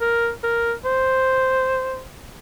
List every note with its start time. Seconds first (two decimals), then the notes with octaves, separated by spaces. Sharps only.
0.01 A#4
0.44 A#4
0.85 C5